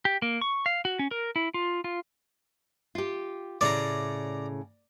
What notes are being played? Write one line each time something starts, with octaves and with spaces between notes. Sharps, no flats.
G4
A#3
C#6
F5
F#4
C#4
A#4
E4
F4
F4
F4 G4
A2 C#3 D5 A#5